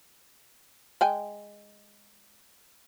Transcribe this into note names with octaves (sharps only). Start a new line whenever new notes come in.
G#3 G5 G#5